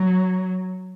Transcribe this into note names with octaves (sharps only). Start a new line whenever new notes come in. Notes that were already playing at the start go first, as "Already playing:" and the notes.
Already playing: F#3